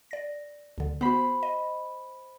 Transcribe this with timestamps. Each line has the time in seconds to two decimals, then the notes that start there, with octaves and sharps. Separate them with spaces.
0.11 D5 A#6
0.78 D2 D3
1.01 B3 F#4 C5 B5
1.43 D#5